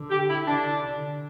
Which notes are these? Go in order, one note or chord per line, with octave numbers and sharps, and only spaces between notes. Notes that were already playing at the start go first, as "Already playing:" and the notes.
Already playing: D3
G4
E4
D3 D4